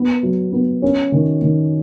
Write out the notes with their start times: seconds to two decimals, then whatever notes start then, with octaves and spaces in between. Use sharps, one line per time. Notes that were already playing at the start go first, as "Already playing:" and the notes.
Already playing: B3
0.23 F#3
0.52 B3
0.82 C#4
1.12 D#3
1.42 D#3